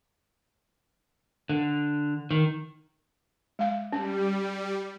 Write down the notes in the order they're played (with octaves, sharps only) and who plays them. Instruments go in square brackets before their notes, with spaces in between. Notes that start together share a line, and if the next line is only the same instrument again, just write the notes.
[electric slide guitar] D3
D#3
[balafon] G#3 F5
[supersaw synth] G3 [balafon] C#4